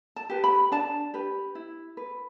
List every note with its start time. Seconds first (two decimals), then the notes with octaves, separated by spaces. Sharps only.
0.16 A5
0.30 G4 B4
0.44 B5
0.72 D4 A5
1.14 G4 B4
1.55 E4
1.97 B4